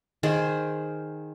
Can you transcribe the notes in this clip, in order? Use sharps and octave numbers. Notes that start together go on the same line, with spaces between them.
D#3 G#4 C5